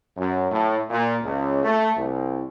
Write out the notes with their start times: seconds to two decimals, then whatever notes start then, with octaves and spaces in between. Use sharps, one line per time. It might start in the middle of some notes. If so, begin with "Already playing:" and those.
0.17 F#2
0.51 A2
0.90 A#2
1.23 C#2
1.64 A3
1.96 C2